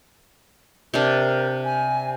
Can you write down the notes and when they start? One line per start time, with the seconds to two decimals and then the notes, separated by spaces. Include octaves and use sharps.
0.94 C3 D4 A#4
1.65 G#5